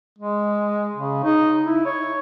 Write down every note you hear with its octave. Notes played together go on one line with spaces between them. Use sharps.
G#3
C#3
D#4
E4
C#5